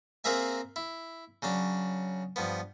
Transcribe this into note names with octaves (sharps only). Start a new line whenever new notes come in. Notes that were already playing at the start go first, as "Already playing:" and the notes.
A#3 C4 G#4 A#4 E5 G#5
E4
C#3 F#3 D4
G2 F3 B3